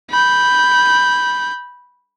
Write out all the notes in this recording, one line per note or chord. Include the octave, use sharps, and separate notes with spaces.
B5 G6